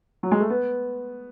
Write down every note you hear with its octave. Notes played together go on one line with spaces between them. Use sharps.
F#3
G#3
A3
B3